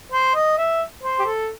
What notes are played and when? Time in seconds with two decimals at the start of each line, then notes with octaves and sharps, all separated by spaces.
0.12 C5
0.35 D#5
0.57 E5
1.03 C5
1.19 G4
1.25 A4